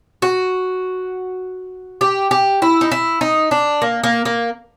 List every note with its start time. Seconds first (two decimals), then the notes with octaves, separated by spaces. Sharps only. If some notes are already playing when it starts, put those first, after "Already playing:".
0.22 F#4
2.01 G4
2.31 G4
2.62 E4
2.81 D#4
2.91 E4
3.21 D#4
3.51 D4
3.82 A#3
4.03 A#3
4.25 A#3